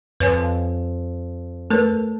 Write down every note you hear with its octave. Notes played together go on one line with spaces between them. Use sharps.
F2 B4 C#5 G#5
A3 A#4 B4 C#5